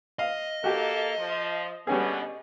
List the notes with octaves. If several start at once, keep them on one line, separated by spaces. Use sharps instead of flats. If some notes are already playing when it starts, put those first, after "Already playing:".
D#5 F5
A#3 F#4 G4 A4
F3
B2 D3 G3 B3 C#4 G#4